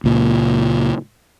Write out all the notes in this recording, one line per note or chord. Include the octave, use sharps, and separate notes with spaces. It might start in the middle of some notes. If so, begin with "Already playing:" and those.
C#2 A#2